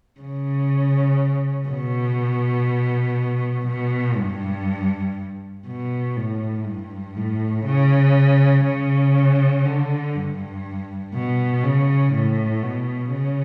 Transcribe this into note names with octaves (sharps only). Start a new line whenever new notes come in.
C#3
B2
B2
G2
B2
A2
G2
A2
C#3
C#3
D3
G2
B2
C#3
A2
B2
C#3